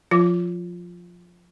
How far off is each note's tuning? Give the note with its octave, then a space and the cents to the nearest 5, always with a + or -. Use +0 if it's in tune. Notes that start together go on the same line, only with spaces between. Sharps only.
F3 +15 F4 +0